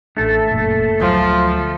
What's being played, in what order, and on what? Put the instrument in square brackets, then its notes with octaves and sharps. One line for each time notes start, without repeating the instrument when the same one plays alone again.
[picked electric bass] A1 D4 [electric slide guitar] A3 A4
[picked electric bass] F#1 A#2
[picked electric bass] D2 F#3 [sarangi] F3